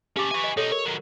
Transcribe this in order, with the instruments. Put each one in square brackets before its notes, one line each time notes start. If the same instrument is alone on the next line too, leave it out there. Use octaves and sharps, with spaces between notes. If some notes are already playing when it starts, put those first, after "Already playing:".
[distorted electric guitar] C#4 A4 [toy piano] G4 F5 D6
[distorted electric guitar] B4 G#5 [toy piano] E5 F5 C#6
[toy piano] D#5
[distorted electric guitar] B2 D#4 [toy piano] A4 C#5
[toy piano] A#4 [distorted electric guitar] C#5
[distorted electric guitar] D#3 F#3